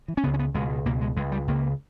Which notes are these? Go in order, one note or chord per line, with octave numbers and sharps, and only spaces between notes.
E3
C#4
C#2 C#3 B3
C#4
B3
C#2 B2 G#3
C#2 B2 A#3
G#3
C#2 C#3 G#3
G3
C#2 C#3 A#3